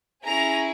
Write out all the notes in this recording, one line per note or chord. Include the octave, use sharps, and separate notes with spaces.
C#4 E4 G#4 A#5